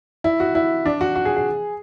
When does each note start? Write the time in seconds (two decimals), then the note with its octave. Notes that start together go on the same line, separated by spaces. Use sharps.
0.24 E4
0.40 F#4
0.55 E4
0.86 D4
1.01 F#4
1.16 F#4
1.25 G#4
1.36 G#4